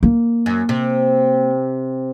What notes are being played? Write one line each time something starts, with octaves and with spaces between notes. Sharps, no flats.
A#3
F#2
C3